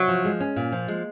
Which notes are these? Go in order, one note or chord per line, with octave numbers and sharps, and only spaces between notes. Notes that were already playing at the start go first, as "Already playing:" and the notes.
Already playing: C3 F#3
F3
G#3
C#4
A#2
F3
G#3